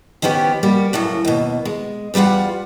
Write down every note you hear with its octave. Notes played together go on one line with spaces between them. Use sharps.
D#3 F3 B3 C#4 G4
G3 A#3 F#4
F#2 A2 C#3 F#3
D#2 B2
G#3
E2 G3 A3 F4 F#5